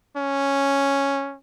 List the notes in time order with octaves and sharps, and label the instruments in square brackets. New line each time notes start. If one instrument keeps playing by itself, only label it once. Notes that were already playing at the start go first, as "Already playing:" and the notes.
[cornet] C#4